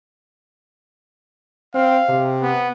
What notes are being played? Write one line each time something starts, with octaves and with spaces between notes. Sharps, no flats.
C4 F5
C3
B3